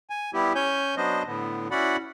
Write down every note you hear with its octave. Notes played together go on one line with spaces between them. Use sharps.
G#5
G3 B3 E4 G4
C#4 C#5 G#5 G6
F#3 B3 D4 C5 D#5
A2 D3 B3
C#4 E4 F#4 D5 F#5 B5